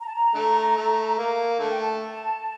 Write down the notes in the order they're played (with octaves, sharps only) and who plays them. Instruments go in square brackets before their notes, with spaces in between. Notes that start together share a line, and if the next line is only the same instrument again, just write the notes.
[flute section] A#5
A5
A#5
[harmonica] D3 A3
A3
A#3
[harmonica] D3 A3 [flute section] A5
[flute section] G5
A5